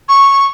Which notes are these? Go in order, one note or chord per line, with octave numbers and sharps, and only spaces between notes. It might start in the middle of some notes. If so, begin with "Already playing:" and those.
C#6